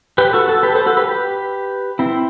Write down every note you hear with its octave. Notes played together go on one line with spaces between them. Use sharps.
G4 B4
F#4 A4
F#4 A4
G4 B4
A4 C5
F#4 A4
G4 B4
G4 B4
C4 E4